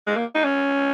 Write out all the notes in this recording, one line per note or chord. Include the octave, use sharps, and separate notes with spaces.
G#3
A#3
D#4
C#4